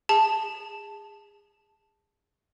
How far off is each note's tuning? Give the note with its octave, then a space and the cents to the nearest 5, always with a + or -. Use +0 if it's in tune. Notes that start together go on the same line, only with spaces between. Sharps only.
G#4 -25 A5 +0